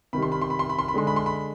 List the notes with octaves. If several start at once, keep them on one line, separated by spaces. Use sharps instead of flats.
C3 D#3 G3 B5
C6
B5
C6
B5
C6
B5
C6
B5
D3 G#3 C6
B5
C6
B5